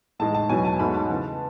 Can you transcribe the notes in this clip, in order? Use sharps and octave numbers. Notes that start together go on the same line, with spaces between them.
A2 E3 G#3 D#4 A5
A5
E2 B2 F#3 G#5
A5
G#2 F#3 A3 D#4 B5
A5
C#3 E3 B3